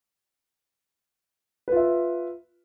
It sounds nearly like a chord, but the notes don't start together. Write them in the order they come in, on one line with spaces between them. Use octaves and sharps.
B4 F4 E5